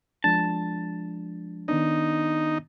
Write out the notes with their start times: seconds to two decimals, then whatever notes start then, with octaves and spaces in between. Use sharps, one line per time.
0.24 F3 G#3 D4 A5
1.68 D#3 B3 D4 D#4